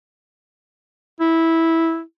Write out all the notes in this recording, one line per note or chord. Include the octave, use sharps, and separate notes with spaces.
E4